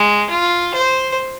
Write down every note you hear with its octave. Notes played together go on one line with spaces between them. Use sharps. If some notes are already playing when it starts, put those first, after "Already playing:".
Already playing: G#3
F4
C5